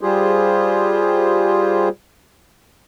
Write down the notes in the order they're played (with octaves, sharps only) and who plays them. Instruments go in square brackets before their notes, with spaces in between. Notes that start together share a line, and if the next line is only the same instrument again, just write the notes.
[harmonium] G3 F4 G4 G#4 C5